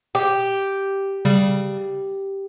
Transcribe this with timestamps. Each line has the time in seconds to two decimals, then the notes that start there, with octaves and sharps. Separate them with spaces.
0.15 G4
1.25 C#3 G3